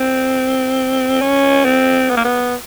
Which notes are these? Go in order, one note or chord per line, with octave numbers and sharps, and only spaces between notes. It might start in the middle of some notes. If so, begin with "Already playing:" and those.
Already playing: C4
C#4
C4
B3
A#3
B3